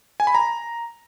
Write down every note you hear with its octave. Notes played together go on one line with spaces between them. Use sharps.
G#5
B5
A#5